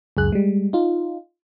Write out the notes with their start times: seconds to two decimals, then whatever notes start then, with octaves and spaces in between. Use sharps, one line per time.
0.17 C#2 F#2 G#4 F#6
0.32 G3 G#3
0.73 D#4 F4